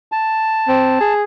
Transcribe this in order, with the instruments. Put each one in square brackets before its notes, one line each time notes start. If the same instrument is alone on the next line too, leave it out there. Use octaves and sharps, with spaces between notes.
[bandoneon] A5
[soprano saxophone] C4
G#4